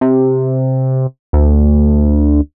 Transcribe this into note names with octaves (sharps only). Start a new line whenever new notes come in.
C3
D2